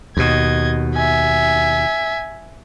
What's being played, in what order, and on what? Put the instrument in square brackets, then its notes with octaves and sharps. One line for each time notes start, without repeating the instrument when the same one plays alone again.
[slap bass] D#2 B2 [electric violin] D#5 G#6
[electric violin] E5 G#5